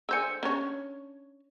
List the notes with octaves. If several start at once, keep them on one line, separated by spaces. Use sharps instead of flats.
D3 C5 G#5 E6 G6 C#7
C#4 D4 C#5